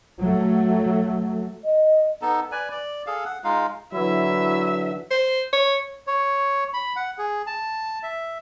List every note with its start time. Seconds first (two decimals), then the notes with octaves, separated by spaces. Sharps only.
0.21 F#3 A3
1.65 D#5
2.22 B3 D#4 A4
2.52 B4 D5 G#5
2.71 D5
3.07 G#4 A4 F5
3.25 F#5
3.44 G#3 D#4 F4 F5
3.93 D3 E3 F#3 E4 E5
5.11 C5
5.53 C#5
6.07 C#5
6.74 B5
6.96 F#5
7.18 G#4
7.47 A5
8.03 E5